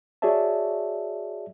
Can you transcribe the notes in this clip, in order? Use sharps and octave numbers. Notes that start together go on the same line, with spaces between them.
F#4 G#4 C#5 D5 E5 A5